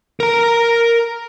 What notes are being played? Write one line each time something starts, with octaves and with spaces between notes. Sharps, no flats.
A#4 A#5